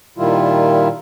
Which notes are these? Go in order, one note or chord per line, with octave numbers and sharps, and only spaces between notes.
A#2 D#3 G3 E4 F4